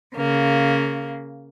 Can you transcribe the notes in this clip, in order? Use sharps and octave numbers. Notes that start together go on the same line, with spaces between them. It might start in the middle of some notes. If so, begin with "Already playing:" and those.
C#3 A#3